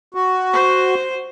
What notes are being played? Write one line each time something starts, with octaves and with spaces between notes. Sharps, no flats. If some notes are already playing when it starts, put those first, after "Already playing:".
F#4
C5